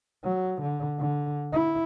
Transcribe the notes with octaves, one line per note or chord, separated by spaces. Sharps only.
F#3
D3
D3
E4